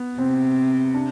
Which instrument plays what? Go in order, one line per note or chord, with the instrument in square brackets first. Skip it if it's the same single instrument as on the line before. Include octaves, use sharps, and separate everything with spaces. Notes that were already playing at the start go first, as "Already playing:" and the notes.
Already playing: [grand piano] B3
[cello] C3 [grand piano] C4
[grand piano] D4